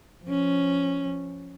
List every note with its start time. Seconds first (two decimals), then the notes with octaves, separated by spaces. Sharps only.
0.24 F3 C#4